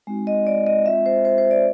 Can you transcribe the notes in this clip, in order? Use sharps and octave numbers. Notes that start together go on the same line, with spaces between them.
G#3 C4 D#4 F#4
D#5
D5
D#5
G#3 C4 F4 E5
C5
C5
C5
D5